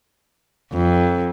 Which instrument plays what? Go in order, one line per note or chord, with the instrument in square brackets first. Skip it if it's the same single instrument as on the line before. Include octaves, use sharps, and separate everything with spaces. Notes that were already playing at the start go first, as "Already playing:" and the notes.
[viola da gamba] F2